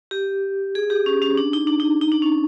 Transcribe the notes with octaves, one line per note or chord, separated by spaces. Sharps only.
G4
G#4
G4
C#4
C#4
D4
D#4
D4
D#4
D#4
D4
C#4